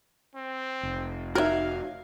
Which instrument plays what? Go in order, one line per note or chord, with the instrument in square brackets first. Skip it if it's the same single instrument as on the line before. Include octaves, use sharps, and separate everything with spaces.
[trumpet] C4
[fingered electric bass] F1
[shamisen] D#4 A#4 [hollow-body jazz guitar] F#4 C#5 E5 [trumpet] F5